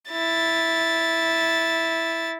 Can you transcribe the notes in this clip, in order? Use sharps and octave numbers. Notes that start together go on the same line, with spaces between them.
E4 A6